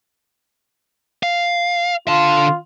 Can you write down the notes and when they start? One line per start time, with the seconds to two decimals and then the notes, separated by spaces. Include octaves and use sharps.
1.23 F5
2.08 D3 F4 A5